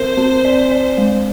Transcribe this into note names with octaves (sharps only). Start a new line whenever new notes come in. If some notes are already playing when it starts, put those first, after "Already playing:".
Already playing: C4 A#4 C5
C4
D5
D5
G#3